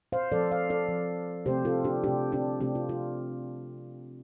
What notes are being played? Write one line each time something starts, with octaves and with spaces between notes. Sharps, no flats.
C5 F5
F3 C4 A4 D5
C5 F5
A4 D5
F3 C4
C3 A3 C4 G4 C5
F4 A4
D4 G4
C3 A3 C4 D4 G4
D4 G4
C3 A3 C4 D4 G4
F4
F4